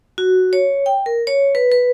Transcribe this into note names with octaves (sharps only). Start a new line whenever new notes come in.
F#4
C#5
G5
A#4
C#5
B4
B4